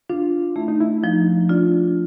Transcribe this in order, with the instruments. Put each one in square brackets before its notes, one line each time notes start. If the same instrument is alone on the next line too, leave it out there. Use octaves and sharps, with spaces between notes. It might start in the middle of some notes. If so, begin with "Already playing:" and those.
[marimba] D4 [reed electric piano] F4
[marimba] A3 [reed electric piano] E4
[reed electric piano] D#4
E4
[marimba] F3 [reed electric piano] D#4
[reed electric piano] D4 [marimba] F4